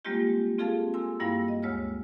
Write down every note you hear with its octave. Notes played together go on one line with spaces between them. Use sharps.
G3 G#3 A#3 C4 F4 G4
C4 F4 G#4 A4 F5 A5
G#5 C6 E6
G2 G3 A#3 E4 F5
D#5
D2 G#3 C#5 E6 F6